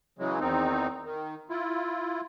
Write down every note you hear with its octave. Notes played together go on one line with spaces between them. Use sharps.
C#3 E3 F#3 G#3
E2 D#3 C4 D#4
D#3
E4 F4